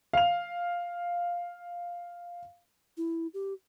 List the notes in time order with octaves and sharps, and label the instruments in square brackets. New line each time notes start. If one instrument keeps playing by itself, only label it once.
[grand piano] F5 F7
[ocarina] E4
G4